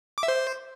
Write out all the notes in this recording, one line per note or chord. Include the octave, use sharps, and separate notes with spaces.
D6
E5
C5